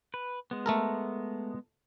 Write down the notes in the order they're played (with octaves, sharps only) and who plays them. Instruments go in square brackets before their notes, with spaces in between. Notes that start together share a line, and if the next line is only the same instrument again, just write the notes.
[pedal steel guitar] B4
G#3 B3
[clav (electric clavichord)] A3 A4 A#4